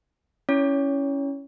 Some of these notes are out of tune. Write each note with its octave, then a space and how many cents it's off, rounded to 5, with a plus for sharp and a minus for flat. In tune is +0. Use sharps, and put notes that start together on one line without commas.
C#4 +0 E4 +0 C#5 +20